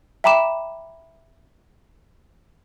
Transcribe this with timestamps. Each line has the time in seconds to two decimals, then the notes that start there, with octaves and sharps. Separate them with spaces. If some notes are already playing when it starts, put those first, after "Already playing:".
0.24 E5 G5 A#5 B5 D6 E7